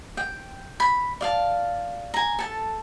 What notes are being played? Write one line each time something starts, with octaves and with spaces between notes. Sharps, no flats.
G5
B5
D5 F5 A5
G#5 A#5
A4 A5